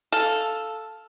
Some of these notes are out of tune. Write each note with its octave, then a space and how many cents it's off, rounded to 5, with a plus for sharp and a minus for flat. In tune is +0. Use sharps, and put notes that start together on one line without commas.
A4 +0 F5 +0